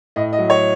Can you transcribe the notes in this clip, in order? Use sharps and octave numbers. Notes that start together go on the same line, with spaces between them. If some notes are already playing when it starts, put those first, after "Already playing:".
A2 D#5
D#5
F#3
C#5